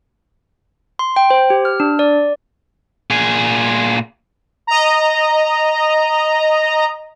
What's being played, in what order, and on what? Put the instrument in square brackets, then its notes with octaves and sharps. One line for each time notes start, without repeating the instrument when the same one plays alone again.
[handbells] C6
G5
C5
G4
F6
D4
D5
[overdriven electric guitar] A#2 G#4
[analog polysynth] D#5 A#5